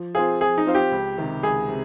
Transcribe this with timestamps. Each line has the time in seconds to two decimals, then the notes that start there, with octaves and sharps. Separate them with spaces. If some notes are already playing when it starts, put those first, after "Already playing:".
Already playing: F3
0.15 C4 F4 G#4 C5 F5
0.41 F3 G#4
0.58 D#4
0.67 C4 F4 C5 F5
0.75 G4
0.92 C#2
1.18 C3 D#3
1.43 C#2 G#4
1.68 C3